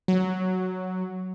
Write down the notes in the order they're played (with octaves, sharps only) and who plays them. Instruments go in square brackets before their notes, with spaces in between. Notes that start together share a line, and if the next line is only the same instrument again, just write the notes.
[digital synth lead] F#3